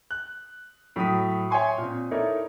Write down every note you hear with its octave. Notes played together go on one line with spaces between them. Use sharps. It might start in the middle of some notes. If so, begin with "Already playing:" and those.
F#6
A2 F#3 B5 D#6 B6
C#5 E5 G5 G#5 C6 C#6
A#2 C4
D#4 E4 A4 A#4 C#5 D5